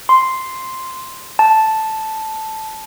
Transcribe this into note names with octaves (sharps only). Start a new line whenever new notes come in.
C6
A5